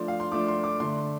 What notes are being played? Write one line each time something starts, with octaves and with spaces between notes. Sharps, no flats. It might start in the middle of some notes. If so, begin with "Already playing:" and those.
Already playing: F3 A3 D4 C6
F5
C6
F3 A3 D4 D6
C6
D6
D3 A3 D4 C6